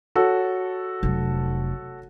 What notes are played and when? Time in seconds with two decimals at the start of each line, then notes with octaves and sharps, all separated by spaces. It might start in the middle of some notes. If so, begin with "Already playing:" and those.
0.16 F#4 A4 C#5
1.03 F1 F#3